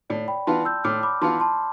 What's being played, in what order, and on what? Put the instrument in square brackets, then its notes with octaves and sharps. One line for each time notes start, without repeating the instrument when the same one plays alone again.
[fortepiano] A2 [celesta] D5
[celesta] G5 B5
[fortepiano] E3 B3 F4 [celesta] A5 C6
[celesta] E6 G6
[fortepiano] A2 [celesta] D6 F6
[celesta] B5 D6
[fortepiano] E3 B3 F4 [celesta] A5 C6
[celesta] A5 C6